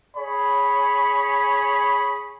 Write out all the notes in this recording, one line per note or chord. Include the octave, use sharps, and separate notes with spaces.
G#4 C#5 B5